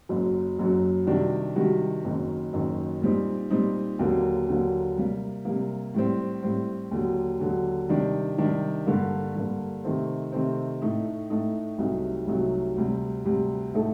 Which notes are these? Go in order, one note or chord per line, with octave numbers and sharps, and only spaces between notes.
F#1 F#2 F#3
F#1 F#2 F#3
C3 D#3 G3 D4 F#4
C3 D#3 G3 D4 F#4
F#1 F#2 D#3 F#3
F#1 F#2 D#3 F#3
A#2 G3 C4 D#4
A#2 G3 C4 D#4
D#2 D3 F#3 A#3
D#2 D3 F#3 A#3
C3 G3 A#3
C3 G3 A#3
A2 G3 C4
A2 G3 C4
D#2 D3 F#3
D#2 D3 F#3
C3 D#3 G3 D4
C3 D#3 G3 D4
G2 D3 G3 A#3
G2 D3 G3 A#3
C3 D#3 A3 C4
C3 D#3 A3 C4
A2 A3 D#4
A2 A3 D#4
C2 C3 F#3 A3 D#4
C2 C3 F#3 A3 D#4
D2 C3 G3
D2 C3 G3
A2 A3 D#4 A4